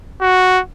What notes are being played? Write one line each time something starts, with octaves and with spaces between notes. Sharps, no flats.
F#4